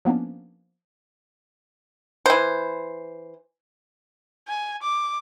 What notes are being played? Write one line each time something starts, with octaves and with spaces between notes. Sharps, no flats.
F3 A#3 B3 C#4 D4
E3 C5
G#5
D6